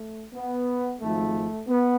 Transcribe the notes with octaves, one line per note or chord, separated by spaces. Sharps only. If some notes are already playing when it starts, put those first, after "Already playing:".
Already playing: A3
B3
G#1 G#2 F3 A3
B3